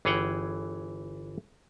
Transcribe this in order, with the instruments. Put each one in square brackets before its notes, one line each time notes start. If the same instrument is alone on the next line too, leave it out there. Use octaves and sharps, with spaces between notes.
[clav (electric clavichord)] G1 E3 G#4 C#5 F#5 G5